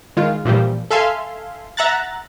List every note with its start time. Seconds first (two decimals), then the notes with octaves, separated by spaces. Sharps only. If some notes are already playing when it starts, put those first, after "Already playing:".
0.17 D#3 G#3 F4
0.45 A#2 E3 F3 G3
0.91 A4 E5 F5 G#5 C6
1.77 E5 F#5 A#5 F#6 A6